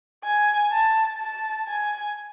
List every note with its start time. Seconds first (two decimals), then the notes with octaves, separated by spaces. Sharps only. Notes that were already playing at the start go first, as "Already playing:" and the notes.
0.24 G#5
0.72 A5
1.20 A5
1.68 G#5